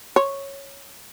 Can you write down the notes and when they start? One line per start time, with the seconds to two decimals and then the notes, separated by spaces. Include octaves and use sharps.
0.16 C#5